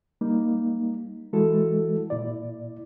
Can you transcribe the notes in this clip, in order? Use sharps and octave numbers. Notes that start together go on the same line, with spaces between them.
G3 A#3 D#4
E3 G#3 E4 F#4 A4
A#2 E4 D5